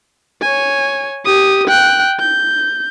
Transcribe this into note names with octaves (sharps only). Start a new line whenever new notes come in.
C#5 G#5
G4 D#6
G5 F#6
G6